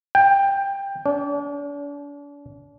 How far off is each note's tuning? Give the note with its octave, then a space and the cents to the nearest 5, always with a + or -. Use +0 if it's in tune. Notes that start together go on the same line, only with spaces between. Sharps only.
G5 +15
D4 -40